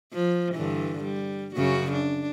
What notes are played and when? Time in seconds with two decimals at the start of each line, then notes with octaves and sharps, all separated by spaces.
0.13 F3
0.54 G2 D3 E3
1.04 G3
1.55 F#2 C#3 F#4
1.92 D4